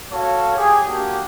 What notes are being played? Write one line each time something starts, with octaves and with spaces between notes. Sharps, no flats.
F#4 A4 C#5 F5
G4 G#4
A#3 D4 F#4 G4